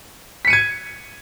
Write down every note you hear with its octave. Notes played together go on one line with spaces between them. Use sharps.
G#6 B6 C#7 D#7